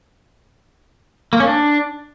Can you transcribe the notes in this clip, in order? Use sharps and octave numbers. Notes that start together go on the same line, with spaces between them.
A#3
C#4
D4